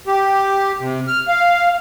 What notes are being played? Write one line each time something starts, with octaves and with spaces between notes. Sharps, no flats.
G4
C3
F6
F5